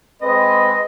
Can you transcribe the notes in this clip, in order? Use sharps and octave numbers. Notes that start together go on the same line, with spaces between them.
G#3 C4 B4 D#5